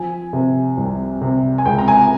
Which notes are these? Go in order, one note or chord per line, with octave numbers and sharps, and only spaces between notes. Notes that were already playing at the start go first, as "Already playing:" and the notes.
Already playing: F3 G#5
C3
C2
C3
G#5
C#2 G5
A#5
G#5